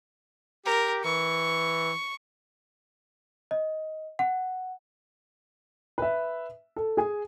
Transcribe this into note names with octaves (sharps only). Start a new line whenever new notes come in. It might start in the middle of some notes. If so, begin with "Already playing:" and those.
G4 A#4
E3 C#6
D#5
F#5
B4 E5
A4
G#4 G#5